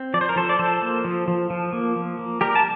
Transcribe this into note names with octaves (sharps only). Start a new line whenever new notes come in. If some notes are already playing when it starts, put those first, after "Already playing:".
Already playing: C4
F3 D5
C5
A#4
F3 A4 C5
D5
F3 A4 C5
A#3
F3
F3
F3
A#3
F3
A#3
G3 G4 A#4
A5